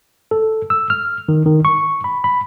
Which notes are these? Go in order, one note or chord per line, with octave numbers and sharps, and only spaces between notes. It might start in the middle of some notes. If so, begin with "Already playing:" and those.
A4
E6
F6
D#3
D#3
C#6
B5
B5